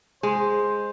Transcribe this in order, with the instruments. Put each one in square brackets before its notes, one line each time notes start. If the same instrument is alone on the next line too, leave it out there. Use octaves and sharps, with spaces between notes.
[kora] G#3 [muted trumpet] C5